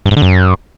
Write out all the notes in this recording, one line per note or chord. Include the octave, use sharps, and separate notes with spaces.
G2
G#2
D3
F#2